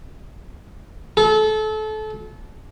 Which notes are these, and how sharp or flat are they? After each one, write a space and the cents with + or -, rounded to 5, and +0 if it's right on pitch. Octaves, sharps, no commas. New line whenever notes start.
A4 -30